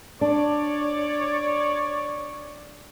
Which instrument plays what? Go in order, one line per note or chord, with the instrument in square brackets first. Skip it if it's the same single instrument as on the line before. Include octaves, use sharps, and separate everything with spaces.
[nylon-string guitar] D4 [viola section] C#5 D5